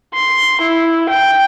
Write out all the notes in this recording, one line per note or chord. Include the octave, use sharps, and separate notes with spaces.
C6
E4
G5